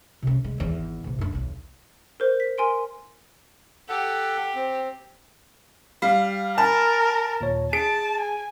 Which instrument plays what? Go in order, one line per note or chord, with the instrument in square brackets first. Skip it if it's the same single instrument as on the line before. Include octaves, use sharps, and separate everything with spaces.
[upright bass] C3 C#4
G#3
G#1 E2
A#1 C3
F#2 D4
B1 E2
[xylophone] A#4 C5
B6
A#4 G#5 C6 D7
[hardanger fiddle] G4 [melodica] A4 F#5
[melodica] C4
[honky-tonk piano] G3 F5
[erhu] A#4 [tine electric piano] G#5 B5 F6 [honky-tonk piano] A5
[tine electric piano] D#2 A#2 C#5
[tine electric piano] G#4 [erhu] A5 [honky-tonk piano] D7
[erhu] G#5